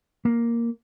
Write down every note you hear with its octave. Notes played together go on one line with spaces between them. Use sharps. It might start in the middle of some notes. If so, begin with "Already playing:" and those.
A#3